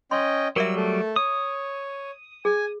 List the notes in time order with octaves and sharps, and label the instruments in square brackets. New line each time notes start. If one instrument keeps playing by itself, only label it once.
[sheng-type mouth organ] C#4 D#5 G5 [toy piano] C6
[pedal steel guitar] F#3 G3 [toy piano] A#4 D5 E5 [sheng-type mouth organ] E6
[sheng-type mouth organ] A3 A4
[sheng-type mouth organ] C#5 [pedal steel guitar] D#6
[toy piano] G#4 [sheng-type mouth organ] G#5